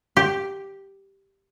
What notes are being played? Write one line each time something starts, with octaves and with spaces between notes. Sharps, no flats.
G4